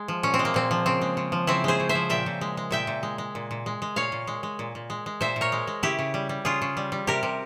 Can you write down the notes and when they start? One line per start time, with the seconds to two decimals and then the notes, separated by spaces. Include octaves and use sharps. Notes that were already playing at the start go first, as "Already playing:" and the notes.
Already playing: G#3
0.08 F3
0.23 A#2 C#4
0.34 C4
0.39 G#3
0.45 A#3
0.54 A#2 C4
0.71 F3
0.86 C#3 C4
1.01 G#3
1.17 C#3
1.32 F3
1.47 C#3 C4 E4
1.64 G#3 G#4 C5
1.80 C#3
1.89 C5 E5
1.95 F3
2.10 A#2 E5 G5
2.26 A#2
2.41 G#3
2.57 G#3
2.71 A#2 E5 G5
2.87 A#2
3.03 G#3
3.18 G#3
3.35 A#2
3.51 A#2
3.66 G#3
3.82 G#3
3.96 A#2 C#5 F5
4.12 A#2
4.27 G#3
4.43 G#3
4.59 A#2
4.75 A#2
4.90 G#3
5.06 G#3
5.21 A#2 C5 E5
5.36 A#2
5.41 A#4 C#5
5.52 G#3
5.67 G#3
5.83 C#3 E4 G4
5.99 C#3
6.14 G3
6.29 G3
6.45 C#3 F4 G#4
6.62 C#3
6.77 G3
6.92 G3
7.07 C3 G4 A#4
7.23 C3